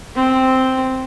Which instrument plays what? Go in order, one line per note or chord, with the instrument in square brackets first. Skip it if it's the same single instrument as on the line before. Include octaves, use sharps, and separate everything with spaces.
[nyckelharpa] C4